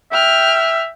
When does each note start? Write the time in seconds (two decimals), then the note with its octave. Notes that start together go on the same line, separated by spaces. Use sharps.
0.12 E5 G5 F6